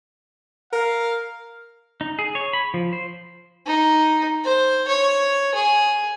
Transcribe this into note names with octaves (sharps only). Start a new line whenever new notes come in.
A#4 F5
D#4
G#4
C#5
B5
F3
C5
D#4
C5
C#5
G#4